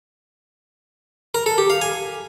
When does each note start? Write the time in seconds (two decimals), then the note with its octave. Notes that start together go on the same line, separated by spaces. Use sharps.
1.34 A#4
1.46 A4
1.58 G4
1.70 F5
1.81 G#5